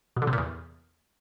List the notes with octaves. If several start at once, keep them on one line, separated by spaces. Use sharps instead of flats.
B2
D3
C3
A#2
E2